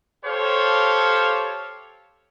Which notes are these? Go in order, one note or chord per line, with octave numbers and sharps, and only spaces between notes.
G4 A4 C5 C#5 F5